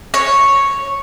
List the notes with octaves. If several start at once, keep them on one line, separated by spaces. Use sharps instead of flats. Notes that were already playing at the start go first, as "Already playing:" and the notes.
C#5